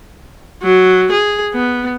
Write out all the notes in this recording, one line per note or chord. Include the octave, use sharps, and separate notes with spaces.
F#3
G#4
B3